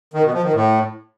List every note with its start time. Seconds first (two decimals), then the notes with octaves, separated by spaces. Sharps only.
0.14 D#3
0.24 B2
0.34 F3
0.44 D#3
0.54 A2